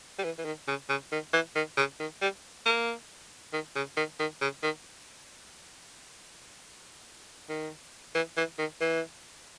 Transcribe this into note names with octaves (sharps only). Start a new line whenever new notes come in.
G3
E3
E3
D#3
C#3
C#3
D#3
E3
D#3
C#3
D#3
G3
A#3
D#3
C#3
D#3
D#3
C#3
D#3
D#3
E3
E3
D#3
E3